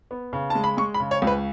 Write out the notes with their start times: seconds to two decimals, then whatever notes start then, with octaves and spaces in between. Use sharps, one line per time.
0.11 B3
0.33 C#3
0.50 G#3 A5
0.64 B5
0.77 G#3 C#6
0.94 B5
1.00 C#3
1.11 C#5
1.22 C#2
1.27 B4